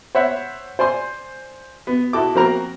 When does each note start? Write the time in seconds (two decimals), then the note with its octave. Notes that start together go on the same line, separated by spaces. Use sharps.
0.15 C5 C#5 E5 F#5 B5
0.79 C5 D5 G#5 C6
1.87 B3
2.13 E4 F#4 A4 D6
2.35 F3 A#3 C4 F#4 A#4 A#5